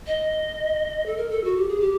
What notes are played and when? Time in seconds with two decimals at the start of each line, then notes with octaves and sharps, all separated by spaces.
0.07 D#5
1.06 A4
1.17 A#4
1.30 A4
1.44 F#4
1.57 G4
1.69 G#4
1.81 G4